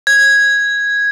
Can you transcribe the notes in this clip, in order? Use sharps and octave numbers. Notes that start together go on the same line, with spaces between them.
G#6